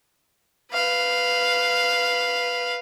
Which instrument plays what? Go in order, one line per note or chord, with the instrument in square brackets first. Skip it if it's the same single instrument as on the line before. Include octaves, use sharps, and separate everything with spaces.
[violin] B4 F5